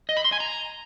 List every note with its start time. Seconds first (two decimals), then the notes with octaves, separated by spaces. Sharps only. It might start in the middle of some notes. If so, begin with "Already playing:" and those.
0.09 D#5
0.17 B5
0.25 C6
0.32 G#5
0.40 A#5